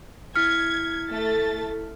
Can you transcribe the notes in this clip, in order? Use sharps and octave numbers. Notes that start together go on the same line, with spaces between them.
E4 F6 G#6 B6 C#7
A3 A4 A6